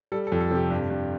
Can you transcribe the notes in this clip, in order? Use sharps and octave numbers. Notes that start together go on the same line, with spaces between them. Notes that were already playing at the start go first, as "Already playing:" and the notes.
G3 A4
A4
F2
A4
C3 G4
G2
G2